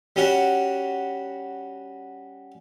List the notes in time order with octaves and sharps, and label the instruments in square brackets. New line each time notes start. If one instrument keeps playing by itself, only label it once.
[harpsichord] G3 C#4 F#4